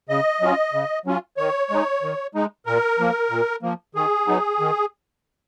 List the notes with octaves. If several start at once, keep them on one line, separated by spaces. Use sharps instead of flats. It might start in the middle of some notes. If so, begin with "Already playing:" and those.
C#3 D#5
F#3 C#4 F4
C#3
F#3 C#4 F4
D#3 C#5
G#3 D#4
D#3
G#3 D#4
A#2 A#4
F3 A#3
A#2
F3 A#3
D#3 G#4
F#3 B3 D#4
D#3